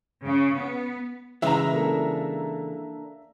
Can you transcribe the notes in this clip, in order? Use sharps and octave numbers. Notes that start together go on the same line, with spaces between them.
C#3
B3
C#3 E3 G#3 E5 A#5
A#3 D4 A4